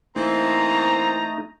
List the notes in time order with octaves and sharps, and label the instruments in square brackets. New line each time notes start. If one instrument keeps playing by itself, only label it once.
[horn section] E3 A#3 C4 [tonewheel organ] A3 D#4 [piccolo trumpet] A#5